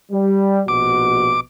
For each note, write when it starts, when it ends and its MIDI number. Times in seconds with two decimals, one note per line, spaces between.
0.11 0.62 55
0.68 1.39 34
0.68 1.39 47
0.68 1.39 66
0.68 1.40 86